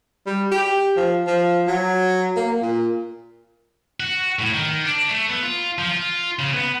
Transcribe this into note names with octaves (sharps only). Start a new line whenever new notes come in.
G3
G4
F3
F3
F#3
A#3
A#2
F#4
A2
D#3
D4
A3
B3
F4
F3
F4
C#3
B3